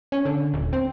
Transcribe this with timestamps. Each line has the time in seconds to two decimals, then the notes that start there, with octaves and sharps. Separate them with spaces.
0.12 C#4
0.25 D3
0.54 D#1
0.73 C4